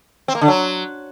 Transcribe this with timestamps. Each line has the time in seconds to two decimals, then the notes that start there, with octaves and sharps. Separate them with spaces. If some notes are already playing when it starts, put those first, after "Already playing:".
0.28 C4
0.35 A#3
0.41 D3
0.48 F#3